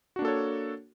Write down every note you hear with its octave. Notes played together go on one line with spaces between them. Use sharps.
A#3 D4 F#4 A4 C#5